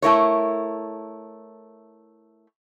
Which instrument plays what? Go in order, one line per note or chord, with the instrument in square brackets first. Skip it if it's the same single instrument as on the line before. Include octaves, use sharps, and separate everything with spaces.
[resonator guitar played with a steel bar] A3 E4 A#4 C#5